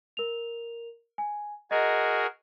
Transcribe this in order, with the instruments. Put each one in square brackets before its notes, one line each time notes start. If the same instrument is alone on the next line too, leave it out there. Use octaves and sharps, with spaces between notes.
[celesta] A#4 F7
G#5
[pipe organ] F#4 G#4 A#4 [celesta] D#5